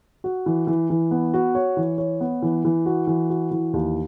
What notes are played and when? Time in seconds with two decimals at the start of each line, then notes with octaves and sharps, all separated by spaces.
0.24 F#4
0.46 E3
0.67 E3
0.90 E3
1.11 B3
1.34 F#4
1.55 C#5
1.77 E3
1.98 C#5
2.20 B3
2.42 E3
2.65 E3
2.86 F#4
3.07 E3
3.30 F#4
3.51 E3
3.74 D#2